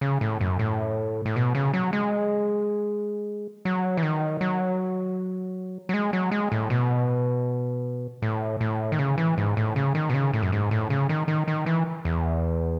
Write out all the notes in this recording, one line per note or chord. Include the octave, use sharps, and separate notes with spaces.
C#3
A2
F#2
A2
A2
B2
C#3
F#3
G#3
F#3
E3
D#3
F#3
F#3
G#3
F#3
G#3
A2
B2
A2
A2
D#3
C#3
E3
G#2
A2
C#3
D#3
B2
C#3
A2
F#2
G#2
A2
C#3
D#3
D#3
D#3
E3
E2